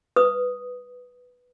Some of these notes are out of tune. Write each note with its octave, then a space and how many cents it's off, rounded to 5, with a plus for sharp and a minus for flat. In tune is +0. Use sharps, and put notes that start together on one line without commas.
B4 +0 D#6 +0